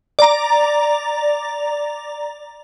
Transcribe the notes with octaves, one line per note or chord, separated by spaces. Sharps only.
D5 A#5